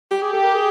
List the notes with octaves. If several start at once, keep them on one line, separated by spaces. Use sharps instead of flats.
G4
G4 G#4
A4
A#4
G#4